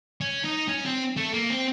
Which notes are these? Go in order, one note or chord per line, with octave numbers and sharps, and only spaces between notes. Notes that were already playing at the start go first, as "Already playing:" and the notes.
C#4
D#4
C#4
C4
A3
A#3
C4